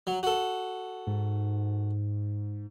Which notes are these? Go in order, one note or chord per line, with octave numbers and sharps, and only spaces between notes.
F#3
F#4 A4
G#2